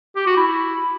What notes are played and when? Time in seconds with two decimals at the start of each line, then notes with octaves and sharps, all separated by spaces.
0.16 G4
0.26 F#4
0.37 E4